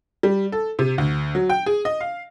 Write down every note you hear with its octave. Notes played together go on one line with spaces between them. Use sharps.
G3
A4
C3
D2
F#3
G5
G#4
D#5
F5